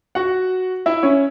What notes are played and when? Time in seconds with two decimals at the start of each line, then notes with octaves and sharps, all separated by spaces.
0.15 F#4 F#5
0.86 E4 E5
1.03 C#4 C#5